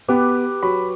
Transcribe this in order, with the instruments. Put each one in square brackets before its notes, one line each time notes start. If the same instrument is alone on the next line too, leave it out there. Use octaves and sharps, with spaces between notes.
[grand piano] B3 [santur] G4 B4
[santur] F#3 [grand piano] B5